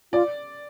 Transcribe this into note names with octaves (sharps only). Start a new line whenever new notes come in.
F4 D5